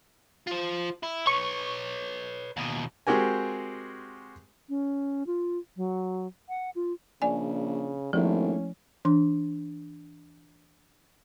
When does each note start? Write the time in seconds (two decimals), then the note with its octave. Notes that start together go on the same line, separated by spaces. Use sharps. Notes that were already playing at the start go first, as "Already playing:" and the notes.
0.47 F4 C5
1.03 E4
1.27 B4 C#5 C#6
2.57 D#2 B2
3.07 G#3 C4 F#4 G4 A#4 G#5
4.69 C#4
5.27 F4
5.76 F#3
6.49 F#5
6.76 F4
7.22 A#1 C#3 D5 G#5
8.13 G#1 F3 A3 A#3 C#4 E4
9.05 E3 D4 C6